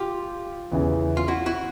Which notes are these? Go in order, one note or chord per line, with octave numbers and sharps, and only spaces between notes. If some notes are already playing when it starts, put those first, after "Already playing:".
Already playing: F4 G4
E2 C#3 E3
F4
E4 F#4
E4 F#4